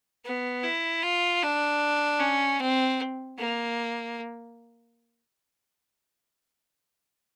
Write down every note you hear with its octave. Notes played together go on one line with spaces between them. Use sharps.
B3
E4
F4
D4
C#4
C4
A#3